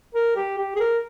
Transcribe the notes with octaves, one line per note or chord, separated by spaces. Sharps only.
A#4
G4
G4
G#4
A#4